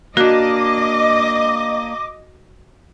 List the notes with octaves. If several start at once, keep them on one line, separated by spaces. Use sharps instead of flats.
A#3 D4 F#4 D#5 D6